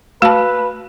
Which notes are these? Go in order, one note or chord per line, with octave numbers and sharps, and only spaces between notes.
A3 F#4 B4 A5